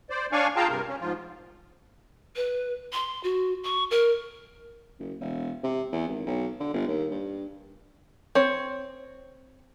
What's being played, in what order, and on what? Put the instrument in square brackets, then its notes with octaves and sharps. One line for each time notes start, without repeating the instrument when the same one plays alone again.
[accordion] C5 D5
D4 C#5 D5 F5 G#5 C#6
F4 G#4 F5 G5 A5 A#5
G2 C3 A#4
C#4
G#2 F3 F4
[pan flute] B4
C6
F#4
C#6
A#4
[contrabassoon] F#1
E1
C3
E2
G#1
B1
D3
G1
D#2
G2
[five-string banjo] C4 C#5